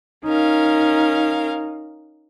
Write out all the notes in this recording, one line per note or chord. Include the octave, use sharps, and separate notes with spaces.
C#4 D#4 A#4 F5